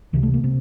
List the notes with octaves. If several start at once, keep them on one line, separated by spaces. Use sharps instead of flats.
C#2 C3 D#3
A3
A#3
C3